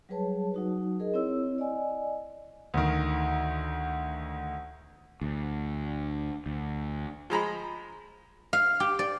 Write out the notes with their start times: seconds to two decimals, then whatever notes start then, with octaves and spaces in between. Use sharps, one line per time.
0.09 F#3 G3 G#4 B4 C#5 A5
0.54 F#3 D#4 F#4
1.00 G#4 A#4 D#5
1.14 C4 E4 C#5 E6
1.58 D5 D#5 G#5
2.74 D2 D#3
5.21 D2
6.46 D2
7.30 F3 G#3 A#5 B5
8.53 F5
8.80 G4
8.99 D5